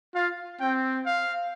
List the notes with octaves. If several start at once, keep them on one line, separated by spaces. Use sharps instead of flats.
F4 F5
C4 G5
F5